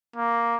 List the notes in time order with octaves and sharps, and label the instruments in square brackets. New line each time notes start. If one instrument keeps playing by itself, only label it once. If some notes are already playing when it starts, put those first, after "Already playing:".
[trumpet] A#3